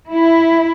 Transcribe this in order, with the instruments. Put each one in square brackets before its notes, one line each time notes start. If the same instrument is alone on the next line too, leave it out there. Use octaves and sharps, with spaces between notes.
[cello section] E4